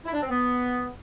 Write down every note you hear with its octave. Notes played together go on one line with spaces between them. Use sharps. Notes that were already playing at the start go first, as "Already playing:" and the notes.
E4
D4
C4
B3